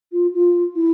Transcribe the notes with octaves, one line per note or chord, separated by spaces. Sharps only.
F4
F4
E4